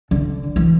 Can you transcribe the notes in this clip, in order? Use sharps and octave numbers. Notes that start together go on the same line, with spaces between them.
D3
E3